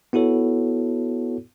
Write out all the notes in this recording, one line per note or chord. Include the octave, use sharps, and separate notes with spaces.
B3 E4 F#4 A4 C#5